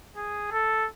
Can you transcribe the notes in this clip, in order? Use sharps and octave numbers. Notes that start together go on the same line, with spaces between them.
G#4
A4